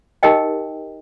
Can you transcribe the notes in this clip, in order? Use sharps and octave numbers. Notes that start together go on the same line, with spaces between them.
D#4 G4 A#4 D#5 G5